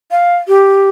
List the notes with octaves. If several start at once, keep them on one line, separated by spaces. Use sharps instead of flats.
F5
G4